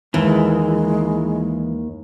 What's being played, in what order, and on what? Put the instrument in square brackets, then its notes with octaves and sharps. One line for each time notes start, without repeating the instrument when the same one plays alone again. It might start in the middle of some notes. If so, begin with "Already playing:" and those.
[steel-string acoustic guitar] D#2 [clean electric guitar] E3 [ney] G#3